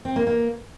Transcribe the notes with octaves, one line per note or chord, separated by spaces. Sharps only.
C4
A#3
A#3